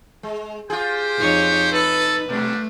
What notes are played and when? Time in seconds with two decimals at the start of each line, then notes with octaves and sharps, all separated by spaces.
0.23 G#3
0.70 F4 G4 G#4 C5 G5
1.17 F2 D#4 C#5
1.72 D#4 A4 B4
2.29 B2 G3 A3 D4